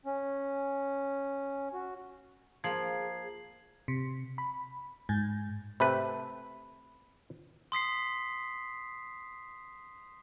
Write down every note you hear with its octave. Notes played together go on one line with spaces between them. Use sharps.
C#4
F#4
F3 A#3 F4 G#4 G#6 C7 F#7
C3
B5
G#2
C3 A3 B4 B5
C6 D#6 B6 C7